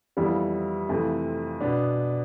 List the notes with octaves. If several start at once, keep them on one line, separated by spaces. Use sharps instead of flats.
F2 E3 G3 B3 E4
F2 C3 E3 A3
B2 B3 D4